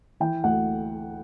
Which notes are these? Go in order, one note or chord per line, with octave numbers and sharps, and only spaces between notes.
E3 G5
D2 F#5